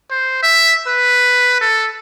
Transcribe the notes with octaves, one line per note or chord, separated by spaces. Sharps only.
C5
E5
B4
A4